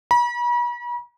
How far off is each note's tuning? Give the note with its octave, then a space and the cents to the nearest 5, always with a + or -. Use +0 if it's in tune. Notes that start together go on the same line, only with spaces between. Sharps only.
B5 -45